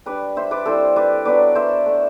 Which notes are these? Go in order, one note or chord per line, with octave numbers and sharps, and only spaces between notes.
G3 D4 B4 D5
C5 E5
B4 D5
G3 C4 E4 A4 C5
B4 D5
F#3 B3 D4 B4 D5
C5 E5
A3 D4